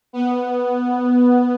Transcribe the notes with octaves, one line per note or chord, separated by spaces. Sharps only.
B3